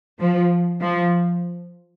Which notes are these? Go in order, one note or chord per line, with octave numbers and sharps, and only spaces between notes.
F3
F3